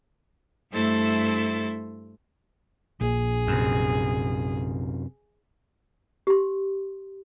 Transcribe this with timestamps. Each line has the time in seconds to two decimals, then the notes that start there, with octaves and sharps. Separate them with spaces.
0.72 G2 A3 E4 A4 C5 A6
3.01 A#1 G#4
3.47 F#2 C3
6.27 G4 C6